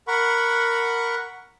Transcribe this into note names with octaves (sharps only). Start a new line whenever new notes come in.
A#4 F#5 B5 C#6